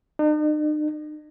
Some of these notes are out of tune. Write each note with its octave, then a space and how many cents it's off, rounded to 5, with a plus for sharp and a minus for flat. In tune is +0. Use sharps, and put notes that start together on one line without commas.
D#4 -45